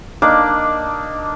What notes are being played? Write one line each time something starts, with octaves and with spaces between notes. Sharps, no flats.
A#3 D4 D#4 D5